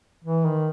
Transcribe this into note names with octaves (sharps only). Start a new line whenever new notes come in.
E3
D#3